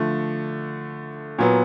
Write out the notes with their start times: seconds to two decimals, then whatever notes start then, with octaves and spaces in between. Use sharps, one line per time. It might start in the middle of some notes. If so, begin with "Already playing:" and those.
Already playing: D3 F3 A3
1.39 A#2 F#3 B3